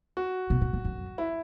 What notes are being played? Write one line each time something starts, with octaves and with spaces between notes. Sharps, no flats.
F#4
B2
A#2
A#2
F#2
E4